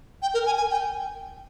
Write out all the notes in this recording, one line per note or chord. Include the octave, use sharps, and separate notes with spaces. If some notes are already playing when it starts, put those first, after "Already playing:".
G5
A#4
G#5
G#5
G5